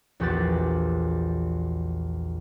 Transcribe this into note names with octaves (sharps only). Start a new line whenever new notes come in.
A#1 E2 F#4 G4 F#6 A6